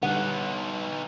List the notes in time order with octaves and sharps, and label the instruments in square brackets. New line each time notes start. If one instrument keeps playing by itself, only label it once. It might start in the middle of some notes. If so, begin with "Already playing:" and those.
[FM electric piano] D3 G3 [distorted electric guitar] B3 D#4 [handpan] F#5